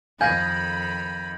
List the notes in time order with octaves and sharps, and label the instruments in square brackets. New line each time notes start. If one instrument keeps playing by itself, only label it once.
[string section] F2 D#3 B5 [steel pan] F5 G#5 [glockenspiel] G6 G#6 A#6